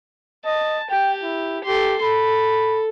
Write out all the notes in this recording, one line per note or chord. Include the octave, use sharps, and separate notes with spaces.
D#5 A5
G4 G5
E4
G4 A4 C6
A4 B5